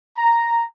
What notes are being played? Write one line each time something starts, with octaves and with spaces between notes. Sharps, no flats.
A#5